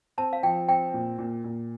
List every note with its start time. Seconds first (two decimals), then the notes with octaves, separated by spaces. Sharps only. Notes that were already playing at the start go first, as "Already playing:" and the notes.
0.18 C4 A5
0.33 F5
0.43 F3 G5
0.68 C4 G5
0.94 A#2
1.19 A#2
1.44 A#2